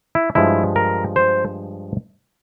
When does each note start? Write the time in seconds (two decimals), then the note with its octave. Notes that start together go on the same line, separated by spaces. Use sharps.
0.15 E4
0.35 G2 F3 G#3 E4
0.76 A#4
1.16 C5